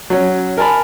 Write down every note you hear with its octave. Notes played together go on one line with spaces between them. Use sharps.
F#3 C#4
A#4 G#5 A5 B5